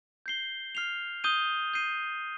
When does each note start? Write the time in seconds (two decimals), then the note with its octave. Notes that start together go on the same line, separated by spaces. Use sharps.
0.26 G6 C7 G7
0.75 F6 C7 F7
1.24 D#6 G6 D#7 G7
1.74 G6 C7 D#7